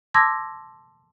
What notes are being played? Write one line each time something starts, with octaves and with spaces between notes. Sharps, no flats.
A5 C6 D6 E6 G#6 A#6